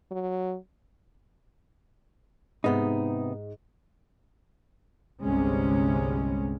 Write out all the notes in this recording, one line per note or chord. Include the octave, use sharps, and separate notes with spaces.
F#3
G#2 C3 B3 D#4
G1 C2 C3 G3 G#3 C#4